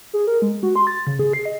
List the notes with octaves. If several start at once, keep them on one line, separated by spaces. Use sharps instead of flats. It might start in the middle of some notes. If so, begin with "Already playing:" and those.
G#4
A#4
G#3
F#4
C6
A6
C#3
G#4
C7
D#5